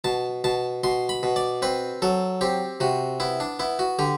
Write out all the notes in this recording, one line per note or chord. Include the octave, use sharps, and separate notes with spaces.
B2 A5
B2 A5
B2 C6
B5
B2
D5
C4 B4
F#3 A4
C4 G4
C3 F#4
B3 E4
D4
B3 E4
F#4
D3 G4